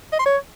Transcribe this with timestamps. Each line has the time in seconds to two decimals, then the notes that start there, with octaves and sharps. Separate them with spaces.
0.13 D#5
0.19 C6
0.26 C#5